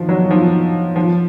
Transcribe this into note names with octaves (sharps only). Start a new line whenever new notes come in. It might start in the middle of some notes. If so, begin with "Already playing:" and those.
Already playing: D#3 F3
F#3
F3
F3